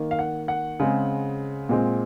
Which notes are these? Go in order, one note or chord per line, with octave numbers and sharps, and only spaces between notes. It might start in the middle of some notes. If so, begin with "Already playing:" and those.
Already playing: D#3 A#3
F5
F#5
F#5
C#3 G#3 C4
A#2 G#3 C4